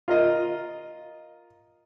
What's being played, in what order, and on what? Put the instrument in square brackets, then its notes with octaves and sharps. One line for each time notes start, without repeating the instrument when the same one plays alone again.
[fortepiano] F4 A#4 D#5